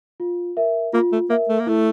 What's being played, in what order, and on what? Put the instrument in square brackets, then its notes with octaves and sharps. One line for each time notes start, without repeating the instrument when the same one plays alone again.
[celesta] F4
A#4 E5
[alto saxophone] A#3 [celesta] F4
[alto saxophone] A3
[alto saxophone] A#3 [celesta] A#4 E5
[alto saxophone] A3
A#3
[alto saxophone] A3 [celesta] E4